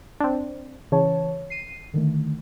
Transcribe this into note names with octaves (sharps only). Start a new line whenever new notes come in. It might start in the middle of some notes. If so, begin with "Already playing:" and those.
C4 D4
C#3 E3 C#5 A5
C7 D#7
D3 D#3 A3